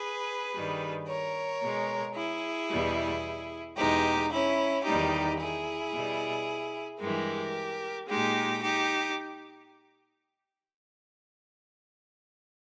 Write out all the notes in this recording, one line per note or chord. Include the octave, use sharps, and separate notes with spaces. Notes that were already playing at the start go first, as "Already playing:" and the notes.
Already playing: G#4 B4
G2 D#3 G3
A#4 C#5
B2 G#3
E4 G#4
E2 B2 G3
E2 B2 G#3 D#4 G4
C#4 E4
E2 D#3 G3 D#4 G4
E4 G#4
B2 G3
G2 E3 G#3 G4 A#4
A#2 G#3 D#4 G4
D#4 G4